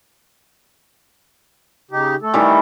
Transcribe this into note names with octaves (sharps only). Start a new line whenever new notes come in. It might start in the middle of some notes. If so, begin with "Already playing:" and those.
C#3 D#4 G4
A3 A4
D#3 E3 G3